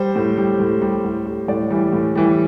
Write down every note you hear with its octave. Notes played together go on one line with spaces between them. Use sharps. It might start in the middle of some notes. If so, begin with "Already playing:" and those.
Already playing: G3 C5
A2
G3
A2
G3
A2
G3
A2 D5
E3 G3
A2
E3 G3